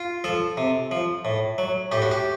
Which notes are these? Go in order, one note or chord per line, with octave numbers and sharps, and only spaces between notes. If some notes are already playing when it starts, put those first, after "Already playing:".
Already playing: F4
F3 A4
C3
F3
A2
F#3
A2 G4
F#4
G4